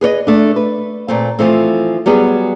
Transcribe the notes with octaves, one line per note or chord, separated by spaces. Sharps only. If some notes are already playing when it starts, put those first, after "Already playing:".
G#4 B4 C#5 D#5
A3 D4
B4
A#2 A3 C4
E3 F3 A3 C4
F#3 G3 B3 G#4